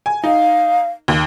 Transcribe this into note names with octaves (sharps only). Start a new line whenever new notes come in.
G#5
D#4 F5
D#2